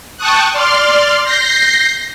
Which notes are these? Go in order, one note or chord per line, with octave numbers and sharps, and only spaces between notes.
G5 A5 C#6 D#6 F#6
D5 C6 F6
G6 A#6 C7